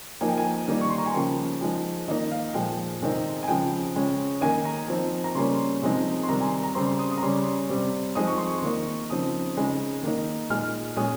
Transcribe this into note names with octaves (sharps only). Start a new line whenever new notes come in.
F3 A#3 D#4 G#5
G5
G#5
D#3 G3 A#3 D#4
C#6
C6
A#5
G#5
C#3 F3 A#3 G5
F3 G#3 D#4
D#3 A#3 D#4 D#5
F5
A#2 F3 G#3 G5
C3 D#3 G#3 C4 D#4
G#5
C#3 F3 G#3 G5
C#3 G#3 C#4
D#3 A#3 D#4 G#5
A#5
F3 C4 D#4
A#5
C#3 G3 A#3 C#4 C6
C3 F3 G#3 C4 D#4
C6
C3 D#3 G3 A#5
G#5
A#5
C#3 G3 C4 C6
C6
D#6
D#6
A#5
C#3 G3 C#4 C6
C3 G3 C4
F3 G#3 C4 D#4 D#6
C#6
C6
C#6
D#3 A#3 D#4
C#3 F3 C4 D#4 D#6
C#3 G#3 D#4
D#3 A#3 D#4
A#2 G#3 D#4 F6
A#2 G#3 C#4 D#6